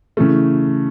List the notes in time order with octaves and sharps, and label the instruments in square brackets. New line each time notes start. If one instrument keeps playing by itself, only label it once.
[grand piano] C#3 E3 A3